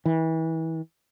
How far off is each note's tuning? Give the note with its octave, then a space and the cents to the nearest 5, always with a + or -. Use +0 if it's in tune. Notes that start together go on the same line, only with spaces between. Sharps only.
E3 -30